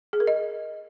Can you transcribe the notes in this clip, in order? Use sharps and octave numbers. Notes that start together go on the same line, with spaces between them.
G#4
A#4
D#5